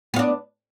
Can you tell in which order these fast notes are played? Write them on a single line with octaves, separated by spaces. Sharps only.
B3 F4 D4